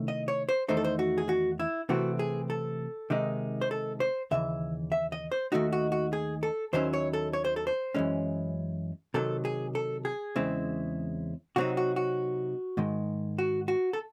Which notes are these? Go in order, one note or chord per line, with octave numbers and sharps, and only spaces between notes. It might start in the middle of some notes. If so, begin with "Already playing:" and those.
Already playing: C3 D#3 A3 C#4 E4
D#5
C#5
C5
E2 D#3 A3 D#4 C5
A4
C5
F#4
G#4
F#4
E4
C3 E3 A3 C4 F#4
G#4
A4
C3 D#3 G#3 D#4
C5
A4
C5
D#2 C#3 E3 E5
E5
D#5
C5
D#2 D#3 A3 D#4 F#4
F#4
F#4
G#4
A4
D#2 D#3 F#3 C#4 E4 C5
C#5
A4
C#5
C5
A4
C5
F#2 E3 G#3 C#4
C3 D#3 F#3 A4
G#4
A4
G#4
E2 C#3 G#3 C4 E4
C3 F#3 C4 D#4 F#4
F#4
F#4
G#2 D#3 G#3
F#4
F#4
A4